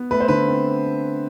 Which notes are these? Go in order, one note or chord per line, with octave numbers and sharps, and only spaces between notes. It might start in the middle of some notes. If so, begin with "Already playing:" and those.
Already playing: B3
A3 B4
C5
D3 B4
C4